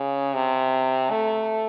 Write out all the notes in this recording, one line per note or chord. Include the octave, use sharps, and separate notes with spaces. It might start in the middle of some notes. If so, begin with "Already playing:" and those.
Already playing: C#3
C3
A3